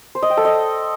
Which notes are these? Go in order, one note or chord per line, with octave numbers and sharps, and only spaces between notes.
C5
D#5
G5
A4
D#5